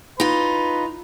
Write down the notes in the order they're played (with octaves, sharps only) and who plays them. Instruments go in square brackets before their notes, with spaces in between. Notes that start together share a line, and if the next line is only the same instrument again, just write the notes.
[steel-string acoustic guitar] D#4 F4 [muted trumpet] B4